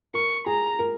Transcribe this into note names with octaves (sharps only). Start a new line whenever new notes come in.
A#4 C#6
G#4 A#5
A#4